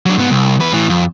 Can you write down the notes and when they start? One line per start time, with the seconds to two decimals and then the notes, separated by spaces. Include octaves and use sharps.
0.06 F#3 D4
0.18 G#2 B3
0.30 C2
0.60 E2 B4
0.72 A2 E3
0.90 F2